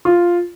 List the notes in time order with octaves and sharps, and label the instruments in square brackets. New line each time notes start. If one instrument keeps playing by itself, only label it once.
[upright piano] F4